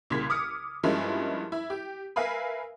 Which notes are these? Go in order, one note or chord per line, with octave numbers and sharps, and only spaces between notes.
C2 A#2 C#3 C6 G#6 B6
D6 D#6 F6 C#7
G2 F3 G#3 A#3 C#4 E4
E4
G4
A#4 B4 E5 F5 G#5 B5